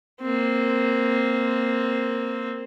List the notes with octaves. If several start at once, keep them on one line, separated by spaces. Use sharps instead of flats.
A#3 C4